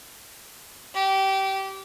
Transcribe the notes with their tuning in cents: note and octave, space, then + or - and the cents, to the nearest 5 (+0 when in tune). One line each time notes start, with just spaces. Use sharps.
G4 -20